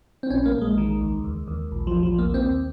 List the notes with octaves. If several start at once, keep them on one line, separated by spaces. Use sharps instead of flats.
C4
A#1 C#4
A#3
A#1
G#3
D#3
C#2
D#2
D#2
A#1
F3
A#1
F3
D#2 A#3
C4
D#2